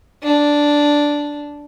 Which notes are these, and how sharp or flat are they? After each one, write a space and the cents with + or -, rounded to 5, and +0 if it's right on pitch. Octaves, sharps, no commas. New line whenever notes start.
D4 -5